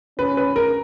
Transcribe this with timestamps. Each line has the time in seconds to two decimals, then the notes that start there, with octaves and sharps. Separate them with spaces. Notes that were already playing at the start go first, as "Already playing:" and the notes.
0.18 C#4 B4
0.37 B4
0.56 A#4